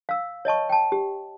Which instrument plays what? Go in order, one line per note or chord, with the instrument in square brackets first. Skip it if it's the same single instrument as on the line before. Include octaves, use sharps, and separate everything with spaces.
[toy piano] F5 E6
C#5 D#5 A5 C#6
G5 A5
G4